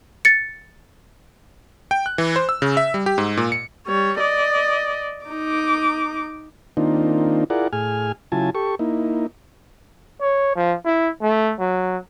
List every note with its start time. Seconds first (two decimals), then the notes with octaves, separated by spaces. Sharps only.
0.25 A6 C#7
1.91 G5
2.06 F#6
2.18 E3
2.36 C5
2.49 E6
2.62 C#3
2.77 E5
2.94 G3
3.06 G4
3.18 G#2
3.37 A#2
3.52 C#7
3.87 G3 C#5
4.19 D5 D#5
5.26 D#4 D6
6.77 D#3 A#3 C4 D4 D#4 F4
7.50 E4 F4 G#4 A#4 D5 F#5
7.73 A2 G#4 G#5 F6
8.32 C#3 F#3 E4 F4 G#5 A5
8.55 G4 A4 C#6
8.79 A#3 D#4 E4
10.21 C#5
10.56 F3
10.85 E4
11.22 A3
11.59 F#3